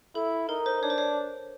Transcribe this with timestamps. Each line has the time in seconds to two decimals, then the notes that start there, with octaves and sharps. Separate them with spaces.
0.15 E4 A4
0.48 D#4 A#4
0.66 C5
0.83 D4 C#5
0.90 C5
0.98 C#5